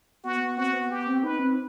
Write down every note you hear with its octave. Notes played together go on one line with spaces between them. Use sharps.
B3 F#4
B3
C4 F#4
B3
B3 G4
C4
D#4 B4
C4